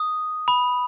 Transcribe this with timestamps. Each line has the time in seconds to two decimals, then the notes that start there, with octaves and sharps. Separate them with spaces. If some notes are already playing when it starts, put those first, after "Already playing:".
Already playing: D#6
0.48 B5